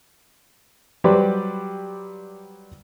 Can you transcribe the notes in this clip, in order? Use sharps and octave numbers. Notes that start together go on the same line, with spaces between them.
F#3 G3 G4 B4 C5 D5